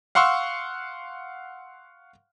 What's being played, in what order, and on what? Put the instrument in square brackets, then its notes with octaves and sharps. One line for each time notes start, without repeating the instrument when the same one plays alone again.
[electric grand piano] F5 F#5 C6 C#6 E6